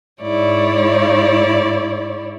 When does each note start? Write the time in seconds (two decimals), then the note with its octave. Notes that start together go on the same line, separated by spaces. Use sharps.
0.22 G#2 E4 C#5 D5